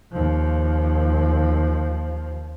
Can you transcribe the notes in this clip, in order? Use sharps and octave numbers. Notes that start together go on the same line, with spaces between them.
D#2 F3